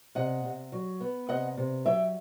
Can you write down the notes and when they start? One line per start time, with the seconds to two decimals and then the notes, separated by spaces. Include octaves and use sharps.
0.15 C3 D#5 F#5
0.44 C3
0.72 F#3
1.01 B3
1.29 C3 D#5 F#5
1.57 C3
1.85 F#3 E5 G5